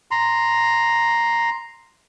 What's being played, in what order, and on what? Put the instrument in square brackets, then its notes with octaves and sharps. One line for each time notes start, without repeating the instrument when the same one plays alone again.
[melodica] A#5 C6